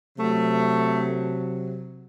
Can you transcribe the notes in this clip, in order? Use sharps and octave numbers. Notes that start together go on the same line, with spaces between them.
C3 F#3 A3